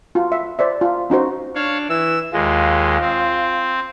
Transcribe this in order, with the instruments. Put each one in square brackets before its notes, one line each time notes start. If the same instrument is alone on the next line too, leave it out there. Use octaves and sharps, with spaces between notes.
[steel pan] F4 F#4
E5
C5 D5 E5
F4
C#4 D#4 F#4 C5
[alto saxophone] D4 [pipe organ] C#5 F5
[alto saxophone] E3 [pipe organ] E6
[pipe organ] D#2 G#3 [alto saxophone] F4
[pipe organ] C4